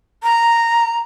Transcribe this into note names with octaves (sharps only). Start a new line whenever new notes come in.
A#5